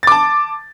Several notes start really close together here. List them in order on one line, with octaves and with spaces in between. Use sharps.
A6 D6 A5